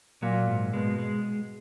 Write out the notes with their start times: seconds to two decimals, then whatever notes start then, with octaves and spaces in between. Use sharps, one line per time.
0.22 A#2 F#3
0.47 G#2
0.73 B2 G#3
0.98 G#3